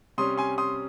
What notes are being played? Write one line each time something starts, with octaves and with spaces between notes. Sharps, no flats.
C3 G3 C#4 C6 D#6
G#5 C6
C6 D#6